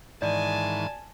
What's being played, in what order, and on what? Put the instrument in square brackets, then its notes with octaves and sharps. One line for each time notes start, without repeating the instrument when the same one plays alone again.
[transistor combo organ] G#2 D#3 E3 [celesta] D5 [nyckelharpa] G#5 A5